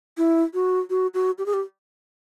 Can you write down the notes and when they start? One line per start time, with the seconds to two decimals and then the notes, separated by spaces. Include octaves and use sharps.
0.18 E4
0.54 F#4
0.90 F#4
1.14 F#4
1.38 G4
1.46 G#4
1.54 G4